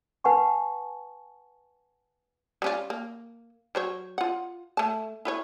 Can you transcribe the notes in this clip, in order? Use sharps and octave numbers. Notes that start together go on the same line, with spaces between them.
B4 F#5 G#5 A5 C#6
G3 C#4 F4
A#3
F#3 C5 C#5
F4 F#5
A3 A5
E4 B4 C#5